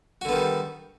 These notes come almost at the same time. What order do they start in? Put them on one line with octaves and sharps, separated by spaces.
F#4 D3 B3 D#3 G3